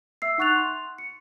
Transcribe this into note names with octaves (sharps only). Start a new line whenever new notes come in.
E5 E6 C7
D#4 F#5 C#6 F#6 A6 F7
C6
C#7